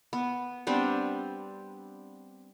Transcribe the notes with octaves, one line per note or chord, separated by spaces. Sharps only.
B3
G3 B3 C4 D4